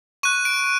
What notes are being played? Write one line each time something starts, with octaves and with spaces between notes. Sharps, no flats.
C#6 F#6 D#7
D7